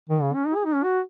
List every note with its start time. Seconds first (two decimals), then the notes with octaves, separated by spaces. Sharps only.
0.09 D#3
0.21 C#3
0.34 C#4
0.47 D#4
0.55 G#4
0.65 D#4
0.74 C#4
0.84 F#4